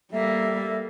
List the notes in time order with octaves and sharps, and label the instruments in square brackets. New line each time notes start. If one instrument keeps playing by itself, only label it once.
[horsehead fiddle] G3 [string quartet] A#3 [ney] A4 [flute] E5